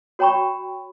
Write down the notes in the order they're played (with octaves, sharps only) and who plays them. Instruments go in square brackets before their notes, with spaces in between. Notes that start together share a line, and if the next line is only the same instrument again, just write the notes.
[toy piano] F#4 C#5 G5 A#5 B5 C#6